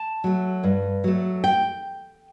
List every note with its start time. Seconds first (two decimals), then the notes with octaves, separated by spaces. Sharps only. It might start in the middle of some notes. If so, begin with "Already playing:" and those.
Already playing: A5
0.24 F#3 A3
0.63 G2
1.04 F#3 A3
1.44 G5